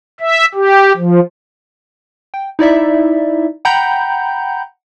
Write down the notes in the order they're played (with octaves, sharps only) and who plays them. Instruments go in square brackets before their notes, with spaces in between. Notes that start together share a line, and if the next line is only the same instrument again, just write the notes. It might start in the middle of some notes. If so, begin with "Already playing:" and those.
[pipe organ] E5
G4
F3
[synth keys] G5
D#4 E4 D5 E5
F#5 G5 A#5 B5 G6